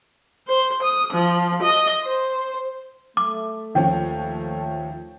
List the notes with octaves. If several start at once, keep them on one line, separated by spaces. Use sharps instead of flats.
C5
D#6
F3
D#5
C5
A3 D6
D#2 F3 C#4 G5